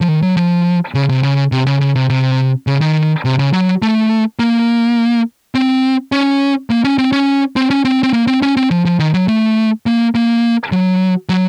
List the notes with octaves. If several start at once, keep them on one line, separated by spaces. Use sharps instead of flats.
F3
D#3
F#3
F3
C#3
C3
C#3
C3
C#3
C#3
C3
C3
C#3
D#3
C3
C#3
F#3
A3
A#3
C4
C#4
A#3
C#4
C4
C#4
C4
C#4
C4
C4
A#3
C4
C#4
C4
F3
F3
D#3
F#3
A3
A#3
A#3
F#3
F#3